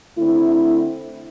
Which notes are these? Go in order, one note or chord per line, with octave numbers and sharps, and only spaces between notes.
D3 A3 C4 E4